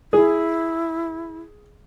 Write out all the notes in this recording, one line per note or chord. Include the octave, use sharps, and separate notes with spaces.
E4 G#4